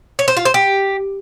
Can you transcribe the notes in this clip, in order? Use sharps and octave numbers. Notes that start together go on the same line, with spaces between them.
C#5
C5
F4
C5
G4